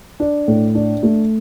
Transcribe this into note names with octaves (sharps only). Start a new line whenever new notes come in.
D4
A2
D4
A3